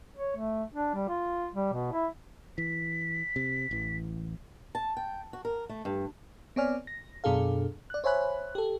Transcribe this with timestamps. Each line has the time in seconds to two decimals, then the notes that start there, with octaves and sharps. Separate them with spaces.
0.17 C#5
0.37 A3
0.74 D4
0.95 G3
1.08 F4
1.55 G3
1.73 B2
1.92 E4
2.58 E3 B6
3.36 C3
3.71 A1 E3
4.75 A5
4.97 G5
5.33 F#4
5.45 A#4
5.69 A3
5.85 G2
6.56 B3 C4 C#5 D5 G#5 F6
6.87 A#6
7.24 F#2 B2 D4 G#4 A4 F5
7.90 D5 F#6
8.04 C5 C#5 E5 G#5 B5 F#6
8.55 G4 A4